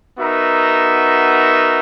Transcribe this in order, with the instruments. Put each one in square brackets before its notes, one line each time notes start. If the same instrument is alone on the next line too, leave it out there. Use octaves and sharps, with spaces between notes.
[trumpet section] B3 D#4 F#4 A#4 E5